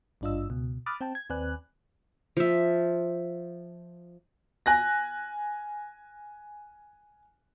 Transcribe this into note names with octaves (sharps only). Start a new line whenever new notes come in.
G#1 G2 D4 F4 D#5 E6
C#2 B2
B5 D6 D#6 F6 F#6 A6
C4 G5 A5
G#6
D#2 C4 B4 D5 G#5 F#6
F3 E5
G#5 F#6 A#6